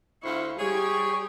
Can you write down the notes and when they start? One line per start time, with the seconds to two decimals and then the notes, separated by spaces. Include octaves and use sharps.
0.23 D2 E4 F4 C5 C#6
0.58 G3 G4 G#4 C#5 C#6